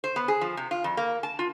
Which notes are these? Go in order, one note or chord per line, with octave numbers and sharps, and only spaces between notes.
C5
B3
G#4
F3
C3
F4
F2
A#3
A5
F4